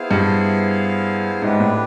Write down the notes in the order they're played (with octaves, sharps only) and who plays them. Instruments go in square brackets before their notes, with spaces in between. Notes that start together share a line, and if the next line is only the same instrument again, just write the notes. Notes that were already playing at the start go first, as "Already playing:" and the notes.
Already playing: [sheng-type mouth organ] B3 E4 G#4 C5 F5
[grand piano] G2
[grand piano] G#2 [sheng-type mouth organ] D4 G4 B4
[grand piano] A2